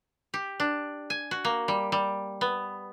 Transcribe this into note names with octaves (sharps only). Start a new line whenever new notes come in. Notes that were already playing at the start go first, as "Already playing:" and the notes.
G4
D4
G#5
F#4
A#3
G3
G3
B3